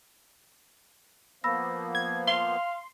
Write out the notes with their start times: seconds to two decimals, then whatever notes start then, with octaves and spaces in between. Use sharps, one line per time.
1.44 F3 A#3 B3 B5 E6 A#6
1.95 G#6
2.27 F5 C6